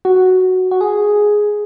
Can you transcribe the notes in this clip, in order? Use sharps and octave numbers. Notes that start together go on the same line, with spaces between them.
F#4
F#4
G#4